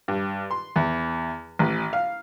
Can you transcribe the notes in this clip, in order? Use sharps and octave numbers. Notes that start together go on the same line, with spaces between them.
G2
C6
E2
A1
F5